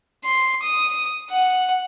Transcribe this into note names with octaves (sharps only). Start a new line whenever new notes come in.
C6
D#6
F#5